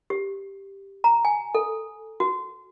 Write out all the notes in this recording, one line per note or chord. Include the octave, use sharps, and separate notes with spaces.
G4
A#5
G#5
A4
F#4